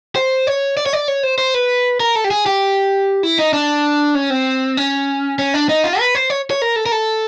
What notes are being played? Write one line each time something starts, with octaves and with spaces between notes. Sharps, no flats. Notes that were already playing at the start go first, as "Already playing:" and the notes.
C5
C#5
D5
C#5
D5
C#5
C5
C5
B4
A#4
A4
G4
G#4
G4
E4
D#4
D4
C#4
C4
C#4
C#4
D4
D#4
F4
B4
C5
C#5
C#5
A#4
A4
A#4
A4